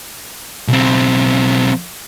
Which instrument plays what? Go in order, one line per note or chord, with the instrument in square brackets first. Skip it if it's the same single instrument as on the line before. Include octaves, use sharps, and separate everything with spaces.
[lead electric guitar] B1 C4